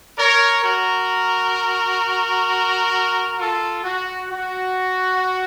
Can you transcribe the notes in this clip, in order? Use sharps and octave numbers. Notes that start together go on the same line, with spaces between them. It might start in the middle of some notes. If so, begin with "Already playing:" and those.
A#4 C#5
F#4 A#4
F4 A4
F#4
F#4